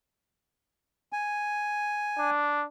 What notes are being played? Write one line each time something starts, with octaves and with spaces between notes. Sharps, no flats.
G#5
D4